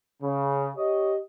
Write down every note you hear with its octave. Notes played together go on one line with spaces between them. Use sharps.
C#3
G4 C#5 D#5